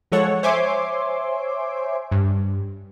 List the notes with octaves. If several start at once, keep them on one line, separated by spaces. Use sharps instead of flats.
F3 G#3 A4 C#5 F#5
C5 C#5 E5 G#5 C6 D6
G2